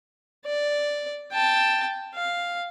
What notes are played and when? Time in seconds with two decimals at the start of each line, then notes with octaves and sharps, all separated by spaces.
0.46 D5
1.32 G5 A5
2.15 F5